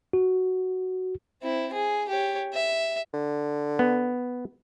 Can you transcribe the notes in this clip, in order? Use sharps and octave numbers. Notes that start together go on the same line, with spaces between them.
F#4
C4 E4
G#4
G4 C#5
E5
D3
B3